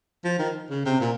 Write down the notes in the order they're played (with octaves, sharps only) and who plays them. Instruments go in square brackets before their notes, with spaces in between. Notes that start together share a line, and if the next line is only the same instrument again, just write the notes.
[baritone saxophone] F3
D#3
C#3
C3
A#2